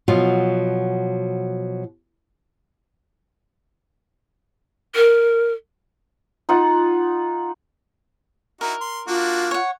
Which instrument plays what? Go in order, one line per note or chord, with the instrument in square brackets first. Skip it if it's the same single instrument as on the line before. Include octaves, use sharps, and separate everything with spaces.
[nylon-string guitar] B2 F3 F#3 F4
[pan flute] A#4
[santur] D#4 F4 F#5
[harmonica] D#4 E4 F#4 [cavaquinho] A#4
[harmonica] C6
[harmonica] A#3 D4 F#4 [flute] F4
[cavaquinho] C#5 F#5